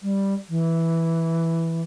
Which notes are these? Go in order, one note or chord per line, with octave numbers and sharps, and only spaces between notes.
G3
E3